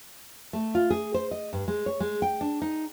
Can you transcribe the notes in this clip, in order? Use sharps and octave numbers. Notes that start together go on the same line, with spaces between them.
A3
F4
G#4
C5
D#5
G2
G#3
C#5
G#3
G5
D4
D#4